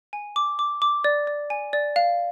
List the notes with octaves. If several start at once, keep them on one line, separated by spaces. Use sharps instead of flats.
G#5
D6
D6
D6
D5
D5
G#5
D5
F5